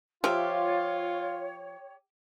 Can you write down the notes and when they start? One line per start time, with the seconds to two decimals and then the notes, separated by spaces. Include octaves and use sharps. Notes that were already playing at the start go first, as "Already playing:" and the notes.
0.24 F3 F4 G4 C#5 E5